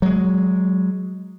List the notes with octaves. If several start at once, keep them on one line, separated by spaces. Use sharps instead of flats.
F#3 G#3